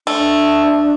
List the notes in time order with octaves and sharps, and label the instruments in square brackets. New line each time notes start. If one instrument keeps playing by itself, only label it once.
[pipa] A3 [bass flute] D4